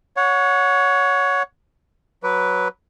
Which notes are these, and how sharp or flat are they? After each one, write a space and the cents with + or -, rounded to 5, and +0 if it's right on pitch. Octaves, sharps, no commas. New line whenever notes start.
C#5 +15 F#5 -20
F#3 +0 B4 +0 D6 -40